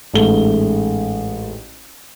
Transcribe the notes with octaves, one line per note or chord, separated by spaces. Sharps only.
A1 G#2 G#3 A3 A4 G7